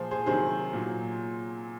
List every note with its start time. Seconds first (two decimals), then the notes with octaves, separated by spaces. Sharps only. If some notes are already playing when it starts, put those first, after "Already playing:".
Already playing: A#2 F3 G#4 C5
0.11 G#4 C5
0.26 C3 D#3 F#3 G#4 C5
0.73 A#2 F#3